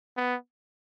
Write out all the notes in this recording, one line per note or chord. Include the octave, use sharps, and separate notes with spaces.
B3